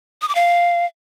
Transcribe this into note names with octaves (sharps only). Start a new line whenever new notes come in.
D#6
D6
F5